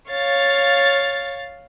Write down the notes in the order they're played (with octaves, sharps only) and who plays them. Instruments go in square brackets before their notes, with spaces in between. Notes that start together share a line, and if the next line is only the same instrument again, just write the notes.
[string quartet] C#5 [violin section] F5 A6